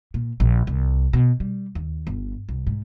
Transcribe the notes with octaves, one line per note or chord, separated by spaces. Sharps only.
A#2
A#1
C2
B2
G3
D#2
G1
C2
G#2